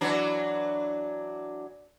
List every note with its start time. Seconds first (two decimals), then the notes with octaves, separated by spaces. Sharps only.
0.01 E3 F#3 D4